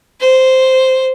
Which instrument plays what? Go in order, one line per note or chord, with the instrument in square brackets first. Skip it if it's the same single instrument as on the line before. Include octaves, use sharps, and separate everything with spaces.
[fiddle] C5